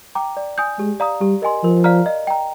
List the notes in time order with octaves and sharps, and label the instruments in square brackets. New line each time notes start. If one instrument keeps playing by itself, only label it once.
[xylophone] G5 A#5 D6
D5
G#5 D#6 G6
[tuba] G#3 [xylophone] G4
[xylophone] D5 F5 A#5 D#6
[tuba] G3 [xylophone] G4
[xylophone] A#4 D#5 G#5 C6
[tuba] F3 [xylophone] A#4
[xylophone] D5 F5 A#5 F6
D#5
G5 A#5